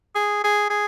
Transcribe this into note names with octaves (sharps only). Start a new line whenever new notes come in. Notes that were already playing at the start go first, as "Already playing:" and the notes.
G#4
G#4
G#4